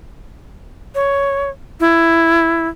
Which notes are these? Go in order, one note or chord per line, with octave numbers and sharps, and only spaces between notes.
C#5
E4